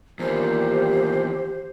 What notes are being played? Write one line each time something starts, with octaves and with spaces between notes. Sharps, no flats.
E2 A#2 D#3 G4 C5